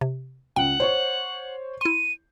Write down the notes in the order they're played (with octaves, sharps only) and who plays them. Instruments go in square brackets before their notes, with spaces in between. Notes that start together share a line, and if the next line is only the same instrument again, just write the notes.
[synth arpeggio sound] C3
[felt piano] C#2 [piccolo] F#5 [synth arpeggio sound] G5
[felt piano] C5 C#5 C#6
[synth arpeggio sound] E4 C6 [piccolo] D#7